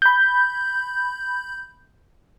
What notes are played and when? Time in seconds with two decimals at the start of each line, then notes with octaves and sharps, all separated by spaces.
0.02 B5 G6